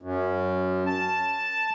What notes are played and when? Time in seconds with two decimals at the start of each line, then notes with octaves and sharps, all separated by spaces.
0.02 F#2
0.87 A5